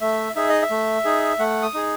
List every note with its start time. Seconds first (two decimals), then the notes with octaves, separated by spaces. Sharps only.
0.01 A3 E5
0.36 D#4 G#4 E5
0.49 D#5
0.62 E5
0.70 A3
1.05 D#4 G#4
1.39 A3 F#5
1.63 D#6
1.74 D#4 G#4